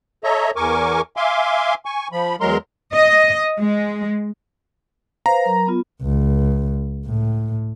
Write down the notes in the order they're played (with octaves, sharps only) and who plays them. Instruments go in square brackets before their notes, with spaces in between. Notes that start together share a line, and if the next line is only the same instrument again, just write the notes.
[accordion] A4 C#5 D#5 E5 A#5
E2 A#4 G#5 C#6 D6
E5 F5 G#5 C6 D6
G#5 C#6
F3 B5
E2 F#3 G#3 A#4 A#5 C6
[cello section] D#5
G#3
[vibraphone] B4 C5 F5 [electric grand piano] A#5
[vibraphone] F#3 A#4
B3 F4
[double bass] C#2
A2